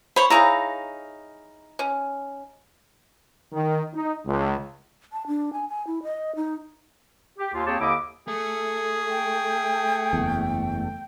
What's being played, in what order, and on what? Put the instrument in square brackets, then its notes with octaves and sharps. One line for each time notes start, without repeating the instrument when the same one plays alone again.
[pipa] C5 [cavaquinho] C#5 B5
[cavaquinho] D#4 F5 A#5 [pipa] E4 G#4 C#5
[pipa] C#4
[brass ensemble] D#3
D#4
C#2
[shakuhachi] A5
D4
G#5
G#5
E4
D#5
D#4
[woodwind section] G4
D#2 F4
D#2 C4 G4 G#4 C#5 A5
D#2 D3 E4 D#5 D6
[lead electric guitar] A3 [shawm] G#4
[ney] G5
[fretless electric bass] F#1 E2